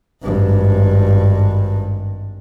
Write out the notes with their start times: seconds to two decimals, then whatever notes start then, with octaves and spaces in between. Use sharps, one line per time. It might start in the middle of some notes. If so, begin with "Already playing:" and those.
0.23 G#1 G2